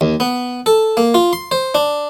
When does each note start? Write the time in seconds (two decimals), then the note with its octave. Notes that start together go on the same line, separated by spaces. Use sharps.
0.01 D#2
0.20 B3
0.66 A4
0.97 A#3
1.14 F4
1.33 C6
1.51 C5
1.75 D4